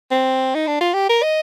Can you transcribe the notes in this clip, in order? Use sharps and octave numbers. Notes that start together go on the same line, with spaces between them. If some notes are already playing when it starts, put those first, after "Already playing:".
C4
D#4
D4
F4
G4
A#4
D#5